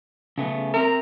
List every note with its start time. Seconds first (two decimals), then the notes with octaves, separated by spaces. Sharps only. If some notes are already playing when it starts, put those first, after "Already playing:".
0.38 C#3 A3 B3
0.74 C4 A#4 E5